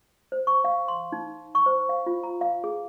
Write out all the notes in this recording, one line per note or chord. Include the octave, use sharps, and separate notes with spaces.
C5
C#6
F5
C6
D#4
C#6
C5
F5
F4
A#5
F5
G#4